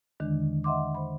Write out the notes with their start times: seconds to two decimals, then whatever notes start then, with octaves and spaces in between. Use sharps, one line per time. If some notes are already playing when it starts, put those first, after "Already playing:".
0.20 E2 D3 D#3 G#3 D4
0.64 D#5 E5 F#5 C6 D6
0.95 C5 B5